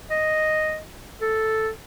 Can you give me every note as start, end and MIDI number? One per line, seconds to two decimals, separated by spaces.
0.10 0.79 75
1.21 1.69 69